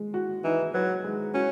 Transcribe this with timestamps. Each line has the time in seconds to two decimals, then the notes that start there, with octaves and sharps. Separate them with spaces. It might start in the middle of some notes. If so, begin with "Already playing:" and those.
Already playing: G#3
0.14 F#4
0.44 E3 D#4
0.74 F#3 B4
1.04 G#3
1.34 C#4 F#4